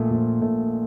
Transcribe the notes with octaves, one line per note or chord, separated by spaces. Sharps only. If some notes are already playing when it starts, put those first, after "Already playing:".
Already playing: A#1 A#2 A3
A#1
A#2 A3